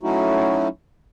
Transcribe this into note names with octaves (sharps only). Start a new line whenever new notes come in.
F#3 A3 C#4 D#4 E4 F#4